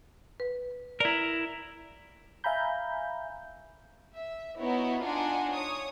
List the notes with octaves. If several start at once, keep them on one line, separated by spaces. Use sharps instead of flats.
B4
E4 A#4 D5 A#5
E5 F5 G#5 A#5 B5 G6
E5
B3 D#4 E4 F#4 C#5
D4 D#4 F4 F#5 G#5
C#5 D#6